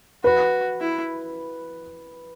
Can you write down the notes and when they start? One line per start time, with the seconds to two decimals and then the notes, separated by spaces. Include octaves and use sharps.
0.24 F#4 B4
0.81 E4